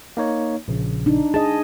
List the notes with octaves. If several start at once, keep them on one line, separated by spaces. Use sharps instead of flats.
A#3 D#4 C#5
A#1 C#3
D4 D#4
G#4 D#5 A5